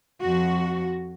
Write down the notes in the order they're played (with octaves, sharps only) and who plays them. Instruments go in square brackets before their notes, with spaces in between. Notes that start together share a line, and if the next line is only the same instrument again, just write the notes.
[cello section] F2 F#4